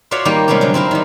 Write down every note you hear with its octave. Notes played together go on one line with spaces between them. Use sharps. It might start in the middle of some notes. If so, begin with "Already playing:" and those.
F4 F#4 C#5 D5 E5 F5
D#3 G3 A#3 G4 F5 G5
C3 G3 G#3 B3 C#4
D3 F#3
C4 E4 A#4 F5
D#3 G3